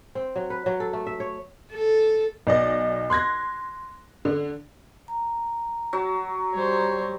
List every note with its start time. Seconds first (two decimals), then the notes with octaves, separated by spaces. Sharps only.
0.15 C4
0.36 F#3
0.50 B4
0.66 F#3
0.80 A4
0.93 A3
1.07 E5
1.20 C#5
1.73 A4
2.47 B1 D5 D#5
3.10 C6 F#6 G#6 A#6
4.25 D3
5.08 A#5
5.93 F#3
6.54 G3 C5 C#5